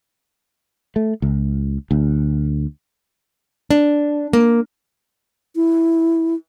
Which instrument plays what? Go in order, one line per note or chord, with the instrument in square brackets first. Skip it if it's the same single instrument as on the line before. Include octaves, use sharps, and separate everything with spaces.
[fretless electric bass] A3
C#2
D2
[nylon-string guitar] D4
A#3
[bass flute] E4